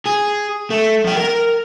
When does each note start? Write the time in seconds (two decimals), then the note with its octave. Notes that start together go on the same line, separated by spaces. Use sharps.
0.06 G#4
0.71 A3
1.05 F3 G5
1.16 A#4